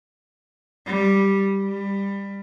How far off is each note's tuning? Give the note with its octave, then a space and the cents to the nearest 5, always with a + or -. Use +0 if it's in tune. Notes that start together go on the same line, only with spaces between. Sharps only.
G3 +0
G3 +20